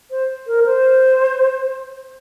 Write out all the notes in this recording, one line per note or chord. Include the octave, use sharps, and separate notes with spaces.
C5
A#4
C5